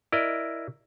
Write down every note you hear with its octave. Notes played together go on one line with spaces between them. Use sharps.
E4 A#4 D5 D#5